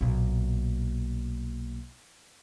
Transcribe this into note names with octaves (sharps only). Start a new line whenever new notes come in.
B1 A#2